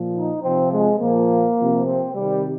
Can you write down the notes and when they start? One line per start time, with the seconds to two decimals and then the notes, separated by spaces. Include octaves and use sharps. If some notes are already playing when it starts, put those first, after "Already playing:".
Already playing: A#2 F3
0.15 D#4
0.42 C3 F3 C4
0.72 G#3
0.99 A#2 F3 A#3
1.58 C3 F3
1.86 C4
2.14 C3 D#3 G3